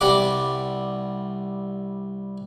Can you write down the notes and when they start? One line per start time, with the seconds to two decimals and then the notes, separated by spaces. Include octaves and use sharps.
0.01 C2 G3 F#5 B5 D6